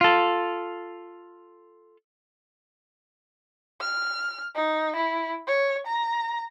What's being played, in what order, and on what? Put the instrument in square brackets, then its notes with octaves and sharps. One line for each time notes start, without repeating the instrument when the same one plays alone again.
[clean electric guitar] F4 A4
[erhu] F6
D#4
E4
C#5
A#5